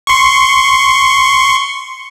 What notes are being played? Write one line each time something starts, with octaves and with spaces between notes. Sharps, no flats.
C6 C#6